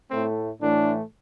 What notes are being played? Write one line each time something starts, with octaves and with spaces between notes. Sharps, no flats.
A2 A3 C4
A2 E3 A3 D4